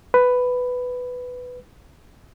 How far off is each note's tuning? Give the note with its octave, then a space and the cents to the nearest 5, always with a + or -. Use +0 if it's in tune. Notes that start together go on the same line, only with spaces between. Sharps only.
B4 +10